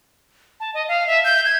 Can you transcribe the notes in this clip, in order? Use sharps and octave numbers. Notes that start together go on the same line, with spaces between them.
A5
D#5
F5
E5
G6
G#6